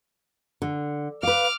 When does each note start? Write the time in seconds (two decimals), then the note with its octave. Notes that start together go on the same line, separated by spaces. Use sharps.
0.62 D3
1.23 B4 F5 D6 F6